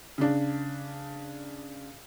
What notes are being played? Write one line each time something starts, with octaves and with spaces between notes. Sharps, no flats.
C#3 D4